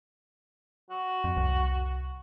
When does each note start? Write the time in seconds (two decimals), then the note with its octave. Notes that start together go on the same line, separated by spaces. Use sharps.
0.90 F#4
1.24 F2
1.37 C2